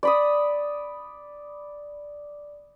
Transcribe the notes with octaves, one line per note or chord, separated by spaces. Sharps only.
D5 B5 D#6